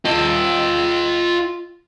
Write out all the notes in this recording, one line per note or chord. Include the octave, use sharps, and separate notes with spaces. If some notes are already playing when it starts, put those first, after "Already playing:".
F4 D#5